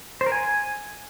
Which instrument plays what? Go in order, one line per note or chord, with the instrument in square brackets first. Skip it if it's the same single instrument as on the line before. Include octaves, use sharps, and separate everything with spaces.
[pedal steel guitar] C5
A#4
G#5